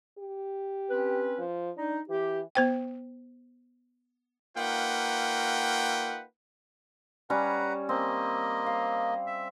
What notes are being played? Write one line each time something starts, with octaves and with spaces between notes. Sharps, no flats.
G4
C4 C#4 B4
F3
D4 D#4
E3 G4
B3 C5 G5
A#3 D#4 F4 B4 F#5 G5
G3 C#4 B4 F#5 A#5
A#3 C4 D#5
F5
E5